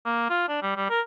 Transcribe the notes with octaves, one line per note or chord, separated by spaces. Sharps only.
A#3
F4
D4
G3
G3
A#4